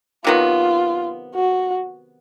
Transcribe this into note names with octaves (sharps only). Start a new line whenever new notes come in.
C3 D#3 F#3 B3 F4
F#4